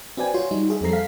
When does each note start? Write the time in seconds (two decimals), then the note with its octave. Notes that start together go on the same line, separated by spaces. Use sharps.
0.17 C4 F#4 B4 D5 G5 G#5
0.34 F4 F#4 C#5 C6
0.51 G3 D#4
0.69 F#4 G#4 E5
0.81 F2 G3 C4 A4 A#5 C7
0.93 F5 B6